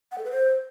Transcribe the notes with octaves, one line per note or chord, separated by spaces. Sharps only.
F#5
A4
B4
C5